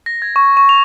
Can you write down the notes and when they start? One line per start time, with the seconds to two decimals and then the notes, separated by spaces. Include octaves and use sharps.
0.06 A#6
0.22 G#6
0.36 C#6
0.57 C#6
0.69 F7